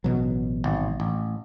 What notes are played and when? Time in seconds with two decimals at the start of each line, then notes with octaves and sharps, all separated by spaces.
0.04 A1 B2 F#3
0.64 G#1
1.00 A1